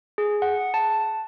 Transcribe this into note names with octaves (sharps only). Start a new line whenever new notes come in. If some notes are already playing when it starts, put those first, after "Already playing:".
G#4
F#5
A5